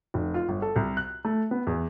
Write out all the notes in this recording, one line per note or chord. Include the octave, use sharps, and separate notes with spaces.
F1
F4
G1
A4
C2
F#6
A3
B3
E2